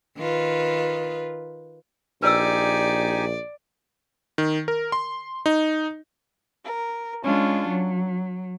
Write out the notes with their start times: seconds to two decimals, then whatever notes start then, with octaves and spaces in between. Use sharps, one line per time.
0.17 D#3 F4 B4
2.22 A#1 D#4 G4 B4 D5 G#5 E6
4.38 D#3
4.68 A#4
4.92 C6
5.46 D#4
6.65 A#4
7.24 G#3 C#4 D4 F4
7.67 F#3